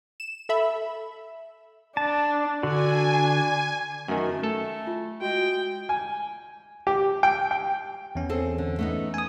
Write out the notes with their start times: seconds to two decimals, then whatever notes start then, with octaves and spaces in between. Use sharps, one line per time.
0.20 E7
0.49 A4 E5 B5
1.97 D4 A5
2.63 D3 D4 F#4 G#5
4.08 F#2 D#3 A3 G#5
4.43 A3 A4
4.87 F4
5.22 G#3 F#4 G5
5.89 G#5
6.87 G4
7.23 G5
7.51 G5
8.15 E2 C#4
8.29 C4 G#4 A4
8.58 D3
8.79 A3 B3 D#4
9.14 G#5 D#6